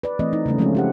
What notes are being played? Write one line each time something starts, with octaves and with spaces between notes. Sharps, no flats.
B4 D5
E3 A3 C4 D5 D#5
D#4
C#3 G3 A3 C#4
F3 G#3 A3 C4 C#4 F4
C#4 G4 F#5